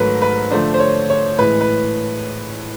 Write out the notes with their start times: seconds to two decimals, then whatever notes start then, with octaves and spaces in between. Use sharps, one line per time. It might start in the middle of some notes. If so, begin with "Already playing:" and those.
Already playing: G#2 D#3 F#3 A3 A#4 B4
0.22 B4
0.51 D3 F3 A3 D4 C5
0.74 C5
0.80 C#5
1.10 C#5
1.38 A2 E3 G#3 B4
1.61 B4